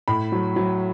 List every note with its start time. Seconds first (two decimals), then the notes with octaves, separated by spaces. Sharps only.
0.08 A2 B5
0.32 F#3
0.56 F#3